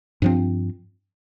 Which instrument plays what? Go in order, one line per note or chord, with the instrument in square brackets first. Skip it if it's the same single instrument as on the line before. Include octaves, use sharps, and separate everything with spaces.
[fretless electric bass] G2 F3 C4